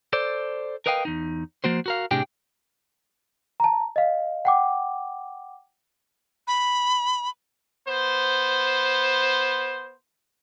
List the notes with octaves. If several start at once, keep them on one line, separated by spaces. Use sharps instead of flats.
A4 C5 D5
A#4 B4 D#5 F5 G5
E2 D#4
F3 A#3 F#4 C5
F#4 A#4 F5
A2 C3 D4 G4 G#4 G5
A5 A#5
D#5 F5
F#5 G5 D6
B5
B3 C5